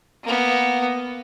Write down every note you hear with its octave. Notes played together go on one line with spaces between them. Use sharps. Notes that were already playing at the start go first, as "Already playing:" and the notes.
A#3 B3